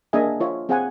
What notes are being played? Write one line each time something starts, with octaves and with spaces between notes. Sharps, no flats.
A#3 D4 G#4 D#5 E5 G#5
F4 C#5 E5
C4 G#4 C5 F5 F#5 G#5